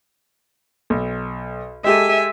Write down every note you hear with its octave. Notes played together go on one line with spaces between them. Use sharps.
B1
G#3 G4 A4 E5 G#5